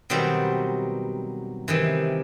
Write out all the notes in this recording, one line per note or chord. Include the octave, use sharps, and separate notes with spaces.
B2 D#3 F#3 G3 C4
C3 D#3 E3